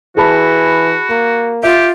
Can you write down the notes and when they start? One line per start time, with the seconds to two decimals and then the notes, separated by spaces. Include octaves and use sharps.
0.17 E3 F#4 G#4 A5 B5
1.10 A#3
1.63 F4 G4 E5